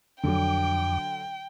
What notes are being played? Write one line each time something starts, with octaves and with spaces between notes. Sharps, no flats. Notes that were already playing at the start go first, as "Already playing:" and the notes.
F2 D3 F#3 G5 D6